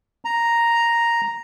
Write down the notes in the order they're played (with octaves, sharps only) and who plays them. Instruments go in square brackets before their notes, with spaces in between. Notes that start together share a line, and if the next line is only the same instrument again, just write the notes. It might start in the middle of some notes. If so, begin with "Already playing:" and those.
[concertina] A#5